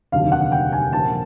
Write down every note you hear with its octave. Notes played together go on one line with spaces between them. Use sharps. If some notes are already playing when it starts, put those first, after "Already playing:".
F1 D#2 D3 F#3 F5
F#5
G5
G#5
A#1 A#2 F3 A#3 A5